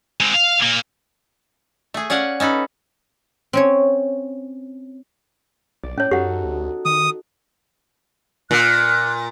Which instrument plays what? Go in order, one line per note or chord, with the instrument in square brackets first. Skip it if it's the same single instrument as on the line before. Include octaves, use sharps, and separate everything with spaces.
[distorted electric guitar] G#3 C4
F5
A#2 A#3
[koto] A3 G#4
C#4 D5 F5 F#5 G#5
C#4 D#4 A4 B4
[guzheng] C4 C#4 C#5
[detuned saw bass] B1 [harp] D5
[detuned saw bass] A2 [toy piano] C#4 C#5
[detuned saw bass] F#2 [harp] D#4 F#4 A4 [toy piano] G4 F#5
[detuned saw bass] D2
[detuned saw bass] D#3 [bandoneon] D#6
[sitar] A#2 [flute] F#6